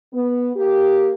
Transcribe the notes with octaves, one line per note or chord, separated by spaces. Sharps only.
B3
A#3 G4